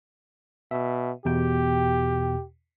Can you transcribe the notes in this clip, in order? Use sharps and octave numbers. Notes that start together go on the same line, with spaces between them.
B2 E5
E2 B2 G4 G5